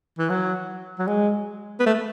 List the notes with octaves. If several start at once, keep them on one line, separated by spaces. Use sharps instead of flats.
E3
F#3
F#3
G#3
B3
A3